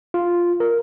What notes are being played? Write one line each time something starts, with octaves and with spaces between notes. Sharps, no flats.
F4
A#4